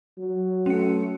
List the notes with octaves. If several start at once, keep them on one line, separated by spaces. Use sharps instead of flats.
F#3
A3 C#4 C#7